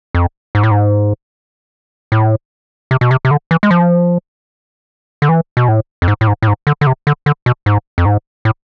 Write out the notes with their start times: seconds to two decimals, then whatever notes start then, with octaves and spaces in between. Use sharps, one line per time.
0.15 F2
0.55 G#2
0.63 A2
0.71 G#2
2.12 A2
2.91 C3
3.01 B2
3.11 C3
3.25 C3
3.31 D3
3.51 E3
3.63 G#3
3.71 F3
5.22 D3
5.29 E3
5.57 B2
5.68 A2
6.02 F2
6.08 G#2
6.21 A2
6.27 G#2
6.42 A2
6.48 G#2
6.67 D3
6.81 D3
6.87 C3
7.07 D3
7.26 D3
7.46 B2
7.66 G#2
7.98 F2
8.06 G#2
8.45 A2